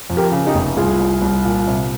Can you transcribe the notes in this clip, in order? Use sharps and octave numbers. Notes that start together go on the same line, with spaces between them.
F2
G4 A#4
C#3
D#4 G4
F1
C2 F4 G#4
C2
C2
A#2
C3